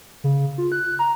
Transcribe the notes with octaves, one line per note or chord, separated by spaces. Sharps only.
C#3
F4
F#6
A#5